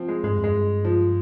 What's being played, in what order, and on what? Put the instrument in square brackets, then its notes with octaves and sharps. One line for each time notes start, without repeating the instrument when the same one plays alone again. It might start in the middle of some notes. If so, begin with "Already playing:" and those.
Already playing: [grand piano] F3 C4
G#3
[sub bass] G#2 [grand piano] G#3
[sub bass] G2
F2
[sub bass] G2 [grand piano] G#3
[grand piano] F3